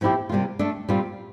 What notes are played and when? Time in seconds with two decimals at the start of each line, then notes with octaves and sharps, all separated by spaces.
0.01 A2 F3 C4 E4 G4
0.29 C3 G3 A#3 F4
0.59 A3 D4 A4
0.89 A#2 G3 C4 F4